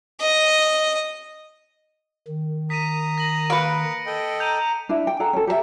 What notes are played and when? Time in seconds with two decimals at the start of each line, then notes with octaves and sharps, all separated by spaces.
0.21 D#5
2.27 D#3
2.70 A#5 D#6 B6 D#7
3.18 A#6 F#7
3.50 A#3 B4 C#7 D7
4.06 A4 D#5 G5
4.40 A#5 G6 D#7
4.89 D4 E4 E5
5.07 G5
5.20 G#4 A4 F#5 A#5
5.33 C#4 A4
5.47 G4 A#4 B4 E5